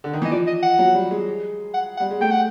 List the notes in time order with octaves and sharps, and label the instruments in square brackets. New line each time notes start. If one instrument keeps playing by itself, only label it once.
[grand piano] D3
D#3
[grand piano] E3 [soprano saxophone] D#5
[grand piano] F3 [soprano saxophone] D5
[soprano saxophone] D#5
F#5
[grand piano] F#3
G3
G#3
[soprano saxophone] F#5
F#5
[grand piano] G3
G#3
[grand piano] A3 [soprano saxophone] G5
[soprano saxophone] F#5